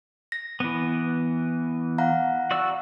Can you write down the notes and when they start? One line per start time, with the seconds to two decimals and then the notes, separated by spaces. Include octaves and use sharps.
0.32 A#6
0.60 E3 B3
1.98 F5 F#5 A#5
2.51 F#4 D5 E6